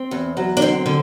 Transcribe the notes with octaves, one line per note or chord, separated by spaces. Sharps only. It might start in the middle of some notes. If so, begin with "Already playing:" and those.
Already playing: C4
E2
F#3
D4
D3 C4
D3